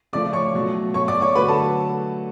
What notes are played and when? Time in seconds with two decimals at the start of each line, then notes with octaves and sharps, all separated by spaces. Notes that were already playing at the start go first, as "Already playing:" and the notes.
0.13 C#3 F3 A3 D5 D6
0.33 C#5 C#6
0.53 B2 F#3 A3
0.94 B2 A3 C#5 C#6
1.08 D5 D6
1.21 C#5 C#6
1.35 D3 F#3 A3 B4 B5
1.49 A4 A5